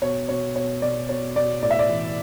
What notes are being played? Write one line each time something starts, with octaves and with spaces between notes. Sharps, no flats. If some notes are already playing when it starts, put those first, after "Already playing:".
B2 C#5
B2 C#5
B2 C#5
B2 D5
B2 C#5
B2 D5
A2 D5
E5
D5
E3